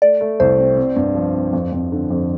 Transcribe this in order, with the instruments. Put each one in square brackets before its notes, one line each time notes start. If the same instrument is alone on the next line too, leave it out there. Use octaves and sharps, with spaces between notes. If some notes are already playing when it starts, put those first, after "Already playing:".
[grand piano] A3 [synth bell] D5
[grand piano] A3
[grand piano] C2 [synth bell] C5
[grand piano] C4
C4
G2
F3
C4
F2
F2
D3
F2